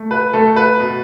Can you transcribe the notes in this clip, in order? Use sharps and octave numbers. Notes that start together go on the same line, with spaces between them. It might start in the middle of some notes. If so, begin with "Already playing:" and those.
Already playing: A3
B4
A3 A4
B4
B2